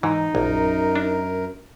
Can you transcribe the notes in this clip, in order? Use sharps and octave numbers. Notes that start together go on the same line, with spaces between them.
G#2 E3 D#4
A#1 F#2 A#4
D4